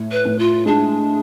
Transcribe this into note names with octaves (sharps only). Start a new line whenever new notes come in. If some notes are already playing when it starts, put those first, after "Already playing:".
Already playing: A2
B4
A2
F4
G#3 D4